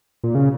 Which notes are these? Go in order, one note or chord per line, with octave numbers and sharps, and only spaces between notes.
A#2
C#3